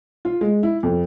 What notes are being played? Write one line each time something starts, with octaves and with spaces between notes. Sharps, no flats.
F4
G#3
E4
F2